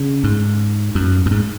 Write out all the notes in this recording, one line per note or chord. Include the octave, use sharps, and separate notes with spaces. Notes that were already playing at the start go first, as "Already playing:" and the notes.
Already playing: C#3
G#2
F#2
F#2
G#2